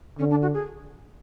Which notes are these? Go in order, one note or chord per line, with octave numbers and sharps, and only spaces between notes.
D3 C#4
D4
F#4
G#4